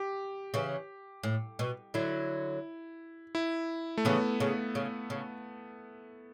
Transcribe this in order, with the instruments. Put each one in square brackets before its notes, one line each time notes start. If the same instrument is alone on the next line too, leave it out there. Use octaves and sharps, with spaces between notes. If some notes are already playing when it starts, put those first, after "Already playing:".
Already playing: [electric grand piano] G4
[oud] C#3 E3
A2
B2
[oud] D3 F#3 [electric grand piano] E4
[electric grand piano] E4
A3
[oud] C#3 E3 [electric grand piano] B3
[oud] C#3
C#3
C#3